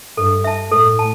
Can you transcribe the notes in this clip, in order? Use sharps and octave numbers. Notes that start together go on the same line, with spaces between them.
G2 A4
E5 A5
A2 A4
A5